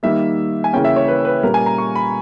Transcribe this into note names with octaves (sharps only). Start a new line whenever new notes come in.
D#3 G3 A#3 E5
G#5
C#3 E3 A#3 C#4 G5
E5
C#5
B4
B4
A#2 G3 C#4 A#4
G#5
A#5
C#6
B5